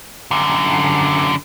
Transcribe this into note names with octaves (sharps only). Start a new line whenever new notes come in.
F#2 D3